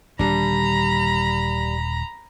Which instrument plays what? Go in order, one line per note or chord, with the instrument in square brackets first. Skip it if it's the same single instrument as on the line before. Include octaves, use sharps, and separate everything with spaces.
[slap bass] D#1 D3 [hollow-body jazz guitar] G3 D4 [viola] A#5 B5